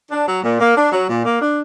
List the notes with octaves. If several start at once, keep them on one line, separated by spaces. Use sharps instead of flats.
D4
F#3
A#2
A#3
D4
F#3
A#2
A#3
D4